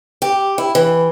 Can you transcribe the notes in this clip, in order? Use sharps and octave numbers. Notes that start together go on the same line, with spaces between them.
G4
E4
E3